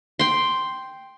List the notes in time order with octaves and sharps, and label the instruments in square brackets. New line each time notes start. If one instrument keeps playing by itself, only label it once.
[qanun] G5 C6